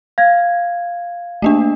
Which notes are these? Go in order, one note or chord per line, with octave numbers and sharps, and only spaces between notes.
F5 G#6
A3 A#3 D4